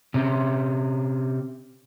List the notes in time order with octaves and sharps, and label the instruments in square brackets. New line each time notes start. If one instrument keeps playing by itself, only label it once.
[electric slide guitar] C3 C#4